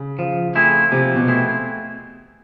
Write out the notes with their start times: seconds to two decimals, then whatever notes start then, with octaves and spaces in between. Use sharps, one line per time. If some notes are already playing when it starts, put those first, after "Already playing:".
Already playing: C#3
0.19 F3
0.55 A3 C4 E4 G#4
0.92 C3 F3
1.16 B2
1.27 A3 C4 E4 G#4